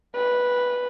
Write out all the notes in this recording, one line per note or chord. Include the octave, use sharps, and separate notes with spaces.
B4